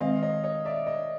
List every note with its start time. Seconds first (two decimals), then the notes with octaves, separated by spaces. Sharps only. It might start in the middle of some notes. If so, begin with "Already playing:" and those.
0.01 D#3 G#3 C4 D#5 F5
0.22 C#5 D#5
0.44 C#5 D#5
0.65 D5 E5
0.86 C#5 D#5